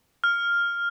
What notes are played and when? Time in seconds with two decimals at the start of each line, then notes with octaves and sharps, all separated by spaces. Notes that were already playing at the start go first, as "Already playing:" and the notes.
0.24 F6